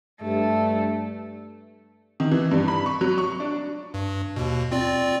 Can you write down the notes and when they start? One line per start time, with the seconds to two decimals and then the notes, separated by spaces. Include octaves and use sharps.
0.21 G2 G3 A3
2.20 D#3
2.31 E3
2.51 G2
2.68 B5
2.86 C#6
3.01 F#3
3.18 C#6
3.40 D4
3.94 G2
4.36 D#2 B2
4.71 C4 F4 D5